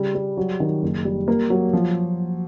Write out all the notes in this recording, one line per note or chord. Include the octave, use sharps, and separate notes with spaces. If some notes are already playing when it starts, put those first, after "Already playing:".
Already playing: C#3 G3
G3
F#3
D#3
F#1
G3
A#3
F#3
F3